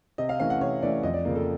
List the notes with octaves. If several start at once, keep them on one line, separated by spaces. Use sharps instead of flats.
C3 D#5
F5
E3 A3 C#4 F5
F#5
C3 C#5
E3 A3 C#4 D5
F2 D#5
D5
C#3 F3 A#3
A4